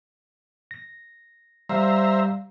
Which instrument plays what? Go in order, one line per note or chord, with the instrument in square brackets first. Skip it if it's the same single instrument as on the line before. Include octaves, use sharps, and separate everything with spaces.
[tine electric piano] A#6
[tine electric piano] G3 G4 F5 [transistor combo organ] C5 E5 A#5